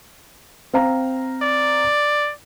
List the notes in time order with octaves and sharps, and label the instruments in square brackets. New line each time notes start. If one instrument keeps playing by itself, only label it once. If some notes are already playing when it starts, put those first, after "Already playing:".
[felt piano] C4 F5 A#5
[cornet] D5